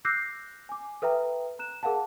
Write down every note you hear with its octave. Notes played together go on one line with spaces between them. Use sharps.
D6 E6 F#6 G6 A#6 C7
G#5 D6
A4 B4 E5 G5 A#5
A#5 F#6 E7
G#4 A#4 F5 F#5 A5